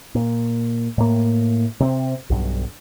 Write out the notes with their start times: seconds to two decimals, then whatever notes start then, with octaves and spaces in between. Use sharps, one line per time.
0.15 A#2
0.98 A2 A#3
1.80 C3 C4
2.30 B1 G2